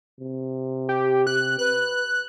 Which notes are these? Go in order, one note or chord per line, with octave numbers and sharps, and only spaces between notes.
C3
G4
F#6
B4 F#6